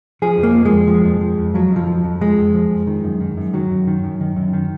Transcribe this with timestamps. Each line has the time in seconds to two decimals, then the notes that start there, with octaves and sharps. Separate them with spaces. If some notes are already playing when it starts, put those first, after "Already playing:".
0.22 F3 G#4
0.38 F2
0.43 A#3
0.55 F3
0.65 G#3
0.72 F2
0.88 F3
1.05 F2
1.21 F3
1.38 F2
1.54 F3 F#3
1.72 F2 F3
1.87 F3
2.04 F2
2.21 F3 G#3
2.37 F2
2.55 F3
2.71 F2
2.87 D#3
3.04 F#2
3.21 D#3
3.37 F#2
3.53 D#3 F#3
3.70 F#2
3.87 D#3
4.04 F#2
4.20 D#3
4.36 F#2
4.53 D#3